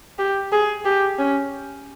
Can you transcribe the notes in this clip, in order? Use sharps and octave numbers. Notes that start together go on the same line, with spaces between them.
G4
G#4
G4
C#4